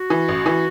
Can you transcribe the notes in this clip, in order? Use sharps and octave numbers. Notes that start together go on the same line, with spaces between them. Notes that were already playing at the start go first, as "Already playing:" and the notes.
Already playing: F#4
E3
A1
E3